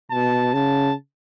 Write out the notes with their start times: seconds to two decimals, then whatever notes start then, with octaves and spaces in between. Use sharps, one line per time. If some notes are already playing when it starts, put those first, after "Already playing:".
0.10 B2 A5
0.54 C#3 A5